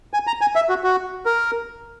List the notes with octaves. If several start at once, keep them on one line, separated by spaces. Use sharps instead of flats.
G#5
A#5
G#5
E5
F#4
F#4
A#4